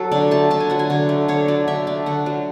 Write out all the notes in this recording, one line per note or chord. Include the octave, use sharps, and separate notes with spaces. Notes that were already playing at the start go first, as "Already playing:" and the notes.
Already playing: F#3 A4
D3 D5
A3 A5
D3 A5
G#5
F#3 F#5
G#5
D3
A3
D3 C#5
F#3 D5
D3 E5
A3 D5
D3 F#5
F#3